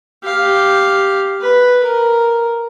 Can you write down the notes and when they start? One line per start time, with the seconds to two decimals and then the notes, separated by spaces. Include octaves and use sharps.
0.23 G4 F5
1.41 B4
1.83 A#4